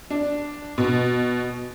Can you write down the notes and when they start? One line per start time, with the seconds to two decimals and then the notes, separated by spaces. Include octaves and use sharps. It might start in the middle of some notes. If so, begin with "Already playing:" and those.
0.11 D4
0.78 B2